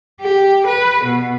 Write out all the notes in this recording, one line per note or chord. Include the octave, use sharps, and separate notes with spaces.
G4
B4
B2